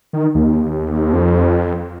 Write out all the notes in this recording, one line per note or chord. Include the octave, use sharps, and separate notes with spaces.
D#3
D#2
F2